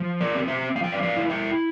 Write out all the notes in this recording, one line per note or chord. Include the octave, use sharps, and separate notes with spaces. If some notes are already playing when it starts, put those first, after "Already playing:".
Already playing: F3
A#4 D5
C4
C5 E5
F3 F5
G5
D5 F5
D5 F5
E4
E5 G5